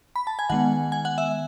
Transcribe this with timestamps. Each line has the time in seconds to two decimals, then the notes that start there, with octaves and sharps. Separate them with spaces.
0.16 B5
0.27 A5
0.39 G#5
0.50 D#3 G#3 B3 F#5
0.92 G#5
1.05 F#5
1.18 E5